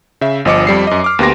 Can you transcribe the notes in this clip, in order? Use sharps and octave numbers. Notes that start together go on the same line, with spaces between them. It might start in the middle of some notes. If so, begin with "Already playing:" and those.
C#3 E5
G1 F3 D#5 D6 C#7
F2 G3 C7
F#2 D#5
D6 F6
D2 A#3 B3 G4 C6 A#6